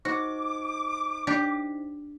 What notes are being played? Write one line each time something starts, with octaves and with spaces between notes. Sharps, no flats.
D#4 F#4 C5 D6
D4 G4